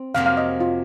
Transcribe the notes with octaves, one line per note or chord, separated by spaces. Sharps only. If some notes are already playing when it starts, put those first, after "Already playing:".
Already playing: C4
F2 C3 F#3 A#3 F5
F5
D#5
F4